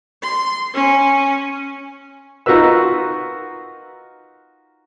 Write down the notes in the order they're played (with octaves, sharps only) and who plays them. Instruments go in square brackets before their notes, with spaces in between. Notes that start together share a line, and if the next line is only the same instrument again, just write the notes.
[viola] C6
C#4
[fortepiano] D#4 F4 F#4 A#4 B4 E6